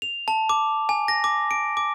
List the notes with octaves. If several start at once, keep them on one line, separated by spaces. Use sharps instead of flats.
F7
A5
D6
G#5
A#6
D6
D7
D6